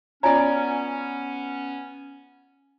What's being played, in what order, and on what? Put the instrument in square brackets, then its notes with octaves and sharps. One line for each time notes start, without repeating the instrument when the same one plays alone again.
[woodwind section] B3 C#4 [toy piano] F4 G#5 A#5 [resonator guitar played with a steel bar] C#5 D5